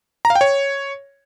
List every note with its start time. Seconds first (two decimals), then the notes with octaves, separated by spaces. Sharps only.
0.25 A#5
0.30 F5
0.35 G5
0.41 C#5